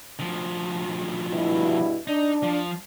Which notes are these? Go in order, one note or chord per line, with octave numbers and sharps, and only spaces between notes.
D2 F3
G2 B2 E4
D4 D#4
F3